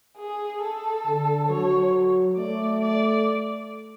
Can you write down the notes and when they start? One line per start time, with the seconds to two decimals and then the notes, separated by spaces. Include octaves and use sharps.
0.18 G#4
0.62 A4
1.06 D3
1.49 F#3 C#5
2.37 A3 D5
2.81 D5